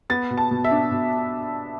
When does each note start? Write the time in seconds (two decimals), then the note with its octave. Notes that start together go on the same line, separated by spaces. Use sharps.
0.10 B3 A6
0.31 B2
0.38 A5
0.51 B2
0.64 E5
0.71 D4
0.91 B2